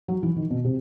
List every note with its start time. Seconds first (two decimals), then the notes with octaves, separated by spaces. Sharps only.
0.08 F#3
0.23 E3
0.36 D#3
0.51 B2
0.65 C3